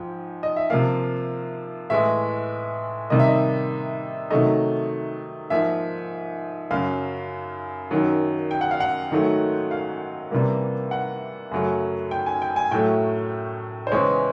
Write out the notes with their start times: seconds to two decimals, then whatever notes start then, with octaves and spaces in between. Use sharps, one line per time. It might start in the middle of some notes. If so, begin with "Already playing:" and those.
Already playing: G#2 F3 G5
0.43 D#5
0.56 E5
0.70 C3 F3 A#3 F5
1.90 A2 E3 G#3 E5
3.10 C3 D#3 G3 A#3 D#5
3.19 E5
3.28 D#5
4.31 C3 D#3 F#3 A3 D#5
5.50 G#2 F3 A#3 E5
6.71 F#2 C#3 F#3 F5
7.91 F#2 D#3 F#3
8.51 G5
8.61 F#5
8.71 F5
8.80 F#5
9.11 G#2 D#3 F#3 A3
9.71 F5
10.31 C3 E3 G3 A#3
10.91 F#5
11.51 F#2 C#3 F#3 A3
12.11 G5
12.26 G#5
12.42 G5
12.56 G#5
12.71 A2 F#3 A3 G5
13.87 C5
13.92 E2 C#3 E3 G#3 C#5